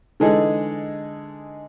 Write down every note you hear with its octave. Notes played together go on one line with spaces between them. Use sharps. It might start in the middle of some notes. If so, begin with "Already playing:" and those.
D3 E3 G#3 D#4 G#4 A4